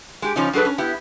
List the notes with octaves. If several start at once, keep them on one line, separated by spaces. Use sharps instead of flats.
G#3 G4
C#3 F3 C#4 D#4
F#3 D4 G#4 A4 B4
C#4
B3 E4 G4